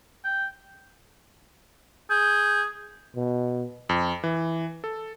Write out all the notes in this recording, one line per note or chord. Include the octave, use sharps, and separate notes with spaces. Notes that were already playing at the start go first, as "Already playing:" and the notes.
G5
G#4 G6
B2
F2
E3
A4